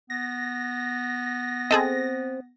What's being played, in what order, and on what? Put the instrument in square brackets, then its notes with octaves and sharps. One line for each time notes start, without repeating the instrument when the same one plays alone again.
[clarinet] B3 [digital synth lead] A#6
[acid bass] C4 [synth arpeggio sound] G#4 A4 D#5